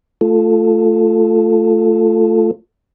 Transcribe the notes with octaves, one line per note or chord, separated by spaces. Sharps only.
A3 F4 A4